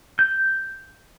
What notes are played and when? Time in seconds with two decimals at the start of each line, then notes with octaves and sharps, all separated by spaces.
0.19 G6